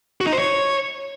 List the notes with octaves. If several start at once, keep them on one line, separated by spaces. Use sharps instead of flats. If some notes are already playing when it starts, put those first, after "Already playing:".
F#4
D#4
C5
C#5